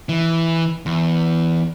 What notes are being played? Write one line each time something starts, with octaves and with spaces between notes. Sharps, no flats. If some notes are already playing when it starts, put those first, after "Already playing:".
E3
E2